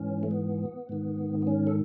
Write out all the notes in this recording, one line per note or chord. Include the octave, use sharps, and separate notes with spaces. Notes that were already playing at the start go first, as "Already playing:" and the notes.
Already playing: G#2 E3 C#4
A3
B3
G#2 D#3
B3
C#4
A4